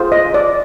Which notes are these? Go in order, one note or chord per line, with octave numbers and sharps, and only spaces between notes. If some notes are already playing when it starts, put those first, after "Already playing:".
Already playing: F4 G#4 C5
D#5
D5